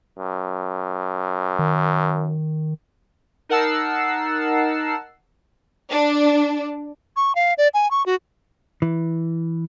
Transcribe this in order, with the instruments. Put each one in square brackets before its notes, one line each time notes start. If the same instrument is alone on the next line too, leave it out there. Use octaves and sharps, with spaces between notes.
[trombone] F#2
[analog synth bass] D#3
[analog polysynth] D#4 A#4 F#5 A5 E6 C7
[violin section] D4
[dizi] C#6
F5
D5
G#5
C#6
F#4
[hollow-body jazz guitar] E3